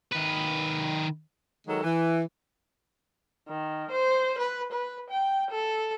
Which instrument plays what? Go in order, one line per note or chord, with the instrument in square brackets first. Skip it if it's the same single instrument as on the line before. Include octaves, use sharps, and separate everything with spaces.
[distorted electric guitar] D#3 B4
[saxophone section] D#3 F#3 G#3 A4
E3
[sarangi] D#3
C5
B4
B4
G5
A4